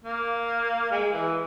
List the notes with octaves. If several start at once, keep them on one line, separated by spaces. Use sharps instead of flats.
A#3
G#3
E3